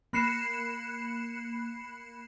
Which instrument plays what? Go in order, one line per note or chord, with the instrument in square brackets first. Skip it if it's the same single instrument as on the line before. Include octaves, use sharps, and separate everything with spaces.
[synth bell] A#3 B5 F#6 C7 C#7 E7